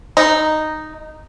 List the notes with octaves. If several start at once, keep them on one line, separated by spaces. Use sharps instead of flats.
D#4